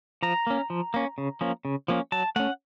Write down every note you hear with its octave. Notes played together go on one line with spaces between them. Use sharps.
F3 A#5
A#3 C#4
F3
A#3 C#4
C#3
F3 A#3 C#4
C#3
F3 A#3 C#4
F#3 A5
A3 C#4 F#5